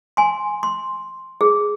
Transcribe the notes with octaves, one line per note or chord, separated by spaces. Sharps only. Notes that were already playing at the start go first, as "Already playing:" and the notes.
G#5 C6
C6
G#4